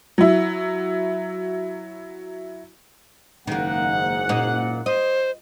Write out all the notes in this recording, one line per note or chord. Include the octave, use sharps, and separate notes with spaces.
F#3 E4
F#1 G#2 D#3 A#3 F#5
A#2 D#4
C5 D#5